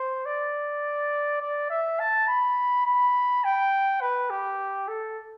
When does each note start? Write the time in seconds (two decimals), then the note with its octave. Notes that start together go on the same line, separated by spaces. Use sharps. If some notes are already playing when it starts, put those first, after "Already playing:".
Already playing: C5
0.26 D5
1.41 D5
1.70 E5
2.00 A5
2.28 B5
2.86 B5
3.44 G5
4.01 B4
4.30 G4
4.88 A4